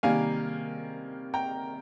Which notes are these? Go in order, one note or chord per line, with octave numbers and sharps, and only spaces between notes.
C3 D#3 G3 A#3 F5 G#5
G5 A#5